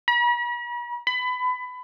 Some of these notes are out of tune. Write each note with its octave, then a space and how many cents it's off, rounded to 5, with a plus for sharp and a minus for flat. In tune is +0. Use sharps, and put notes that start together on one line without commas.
B5 -45
B5 +25